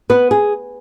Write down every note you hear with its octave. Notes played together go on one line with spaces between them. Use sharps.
B3 B4
G#4